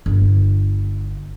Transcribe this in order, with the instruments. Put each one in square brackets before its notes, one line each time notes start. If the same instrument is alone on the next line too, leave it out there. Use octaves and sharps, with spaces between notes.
[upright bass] G1